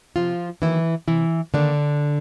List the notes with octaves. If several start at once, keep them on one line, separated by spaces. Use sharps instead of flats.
C3 F3 F4
D#3 E3 F#3 A#3 E4
C3 E3 E4
D3 D#3 F#3 A#3 D4